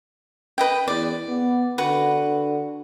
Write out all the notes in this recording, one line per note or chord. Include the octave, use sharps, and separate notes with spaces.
B4 D#5 G5
E2 D5
B3
D3 F#4 B4